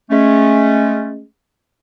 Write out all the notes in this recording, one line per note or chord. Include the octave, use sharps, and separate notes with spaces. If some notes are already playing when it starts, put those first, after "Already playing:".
G#3 A3 C#4